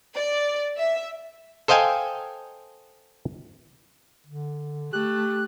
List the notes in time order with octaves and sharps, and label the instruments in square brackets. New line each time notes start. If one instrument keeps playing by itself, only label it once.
[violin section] D5
E5
[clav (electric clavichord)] A4 C5 D#5 F5 G5 G#5
[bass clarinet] D3
[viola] A3 [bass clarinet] G4 [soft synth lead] F#6